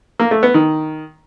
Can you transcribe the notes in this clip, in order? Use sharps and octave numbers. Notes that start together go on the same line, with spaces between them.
A#3
A3
B3
D#3